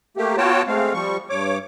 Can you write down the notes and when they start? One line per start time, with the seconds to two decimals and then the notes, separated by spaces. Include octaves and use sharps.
0.17 A3 A#3 G4
0.37 B3 F4 F#4 C#5 G5 A5
0.67 G#3 A3 C4 F5
0.94 F3 G3 C#6
1.30 G2 C#5 D6